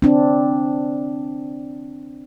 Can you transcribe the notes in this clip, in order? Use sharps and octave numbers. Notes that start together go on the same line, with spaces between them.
C4 D4